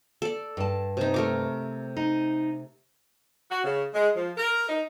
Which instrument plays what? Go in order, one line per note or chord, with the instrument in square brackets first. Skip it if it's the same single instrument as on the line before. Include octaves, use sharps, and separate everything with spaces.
[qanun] A4 D5
[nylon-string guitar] G2 A5
[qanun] C3 D#4
A3 A#4 D6
[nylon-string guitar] D#4
[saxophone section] F#4
C#3
G#3
F3
A#4
D#4